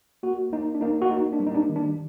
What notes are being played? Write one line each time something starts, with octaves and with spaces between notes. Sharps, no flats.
A#3 F#4
A#3 D#4
D4
A#3 D#4
F#4
A#3 D#4
D4
G3
D#4
D4
D#3
D4